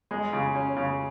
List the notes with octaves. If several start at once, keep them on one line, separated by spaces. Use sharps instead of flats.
G#3
C#3
C#4
C#3